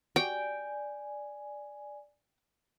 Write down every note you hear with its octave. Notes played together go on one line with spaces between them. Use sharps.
F#4 G4 D5 G5 G#5